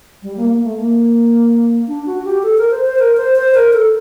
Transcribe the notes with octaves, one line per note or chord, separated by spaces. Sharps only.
G3
A#3
A#3
A3
A#3
D4
F#4
G4
A4
A#4
C5
C5
A#4
C5
C5
A#4
A4